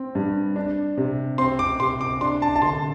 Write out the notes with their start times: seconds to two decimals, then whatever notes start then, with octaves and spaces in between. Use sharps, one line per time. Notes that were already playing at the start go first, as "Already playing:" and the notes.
Already playing: C4
0.15 G2
0.56 D4
0.97 C3
1.38 C4 C6
1.59 D6
1.80 C3 C6
2.01 D6
2.21 D4 C6
2.42 A5
2.56 A5
2.62 D3 C6